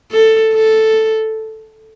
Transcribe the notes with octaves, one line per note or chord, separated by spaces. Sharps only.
A4
A4